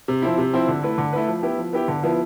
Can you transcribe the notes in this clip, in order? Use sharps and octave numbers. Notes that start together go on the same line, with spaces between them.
C3
F3 C4 E4
C3
F3 C4 E4
D3
A3 E4 B4
D3
A3 E4 B4
F3
B3 E4 G4
F3
B3 E4 G4
D3
F3 B3 E4